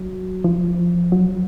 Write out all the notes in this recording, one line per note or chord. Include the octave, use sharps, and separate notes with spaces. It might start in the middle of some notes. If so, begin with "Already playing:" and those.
Already playing: F#3
F3
F#3